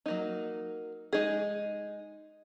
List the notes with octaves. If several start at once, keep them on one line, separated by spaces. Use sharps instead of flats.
F#3 A#3 D#4
G#3 D#4 G#4